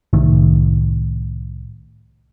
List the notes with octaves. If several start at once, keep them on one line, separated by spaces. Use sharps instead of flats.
C2 A2 D#3